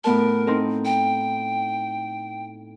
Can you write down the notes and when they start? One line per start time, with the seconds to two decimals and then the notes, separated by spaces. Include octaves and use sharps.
0.04 A2 B3 A#4 A5
0.47 C4 D#4 A4
0.85 G5